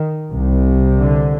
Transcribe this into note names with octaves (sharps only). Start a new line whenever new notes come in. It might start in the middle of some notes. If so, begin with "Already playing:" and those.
Already playing: D#3
C2 C3
D3